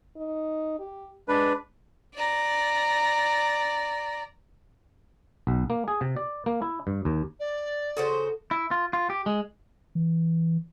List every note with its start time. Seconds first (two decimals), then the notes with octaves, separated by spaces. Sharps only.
0.16 D#4
0.79 G4
1.28 G#3 D4 B4
2.15 D5 A#5
5.47 B1
5.70 A#3
5.88 G#4
6.01 C3
6.16 D5
6.46 A#3
6.62 E4
6.87 G2
7.05 D#2
7.39 D5
7.97 C#3 F#4 A4 C5
8.51 E4
8.71 F4
8.93 F4
9.10 G4
9.26 G#3
9.95 E3